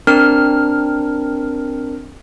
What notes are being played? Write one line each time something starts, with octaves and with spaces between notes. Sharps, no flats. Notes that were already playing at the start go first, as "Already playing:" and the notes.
C4 D4 A#4 F6